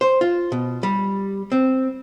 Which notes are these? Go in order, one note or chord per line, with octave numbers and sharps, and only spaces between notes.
C5
F4
B2
G3
C4